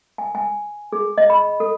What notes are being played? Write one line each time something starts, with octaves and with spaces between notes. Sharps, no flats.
G#5
G#5
G#4
D#5
B5
A4